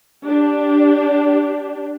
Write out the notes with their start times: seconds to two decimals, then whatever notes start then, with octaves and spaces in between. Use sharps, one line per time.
0.25 D4 G4